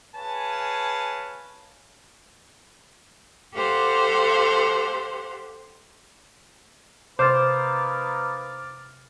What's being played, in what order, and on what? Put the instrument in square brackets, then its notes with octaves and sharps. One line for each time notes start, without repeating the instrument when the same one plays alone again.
[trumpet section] G#4 B4 C#5 F5 G#5 A5
[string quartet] G4 A4 C5 F5 F#5
[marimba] C3 [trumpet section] A#3 D#4 B4 [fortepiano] C5 [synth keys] D6 F6 A6